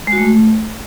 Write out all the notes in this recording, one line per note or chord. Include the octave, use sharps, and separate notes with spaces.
G#3
F#4
A3